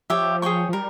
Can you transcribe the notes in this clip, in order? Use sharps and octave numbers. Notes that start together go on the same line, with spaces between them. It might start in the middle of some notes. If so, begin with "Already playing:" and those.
F3 G4 C#5 E5
G#4 C#5 G5 C#6
F3
G3 A#4